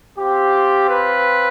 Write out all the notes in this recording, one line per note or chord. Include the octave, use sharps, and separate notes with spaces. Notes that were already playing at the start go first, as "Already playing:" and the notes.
C4 F4 G4
B4